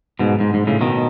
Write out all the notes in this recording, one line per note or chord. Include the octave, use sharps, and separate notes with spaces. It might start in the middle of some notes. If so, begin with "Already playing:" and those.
G#2 B2
G#2
G#2
A2 C#3
B2 D#3